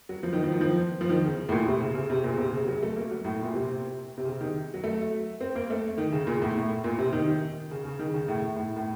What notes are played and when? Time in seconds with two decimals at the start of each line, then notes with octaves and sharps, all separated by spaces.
0.09 F#3
0.23 F3
0.33 D#3
0.43 F3
0.52 D#3
0.61 F3
1.01 F3
1.09 D#3
1.24 C#3
1.49 A2
1.52 A#2
1.67 C3
1.81 C#3
1.95 C#3
2.10 C3
2.24 A#2
2.32 C#3
2.38 C3
2.54 C#3
2.68 F#3
2.82 A3
2.96 A#3
3.11 F#3
3.25 A2
3.42 A#2
3.54 C3
4.18 C3
4.25 C#3
4.41 D#3
4.74 F#3
4.84 A3
5.41 C4
5.56 A#3
5.70 A3
5.98 D#3
6.12 C#3
6.27 A#2
6.42 A2
6.58 A2
6.84 A#2
6.99 C3
7.13 D#3
7.71 C#3
7.85 C#3
7.99 D#3
8.14 C#3
8.28 A2
8.57 A2
8.76 A2